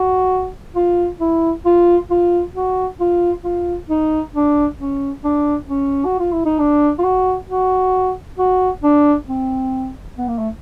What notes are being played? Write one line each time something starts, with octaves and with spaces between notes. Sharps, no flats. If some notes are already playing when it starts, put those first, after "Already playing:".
Already playing: F#4
F4
E4
F4
F4
F#4
F4
F4
D#4
D4
C#4
D4
C#4
F#4
F4
E4
D#4
D4
F4
F#4
F#4
F#4
D4
C4
B3
A#3
A3